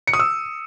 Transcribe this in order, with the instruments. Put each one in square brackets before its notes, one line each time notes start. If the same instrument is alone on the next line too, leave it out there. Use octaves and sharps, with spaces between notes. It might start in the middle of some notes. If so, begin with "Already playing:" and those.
[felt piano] C#7
D#6
E6